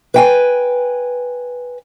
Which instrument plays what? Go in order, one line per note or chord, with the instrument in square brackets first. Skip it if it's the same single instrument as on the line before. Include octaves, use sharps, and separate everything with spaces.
[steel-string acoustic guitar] B4 G5 G#5